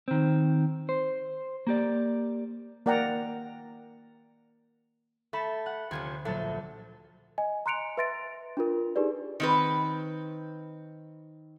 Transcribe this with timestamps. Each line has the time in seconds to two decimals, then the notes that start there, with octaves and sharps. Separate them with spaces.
0.08 D#3 C4
0.89 C5
1.67 A#3 G4 D5
2.86 A#3 A#4 D5 F#5 G5 A#5
5.33 A3 A5 B5 C#6
5.66 F#5
5.91 D2 C3 F3 C#4 G#6
6.25 A#1 F#3 A3 A5
7.38 D#5 G#5
7.66 A#5 C6 F#6 C#7 D7 F7
7.97 B4 E5 C6 A6 A#6 D7
8.57 D4 F4 A#4
8.96 D#4 G4 G#4 B4 D5
9.40 D#3 C4 B4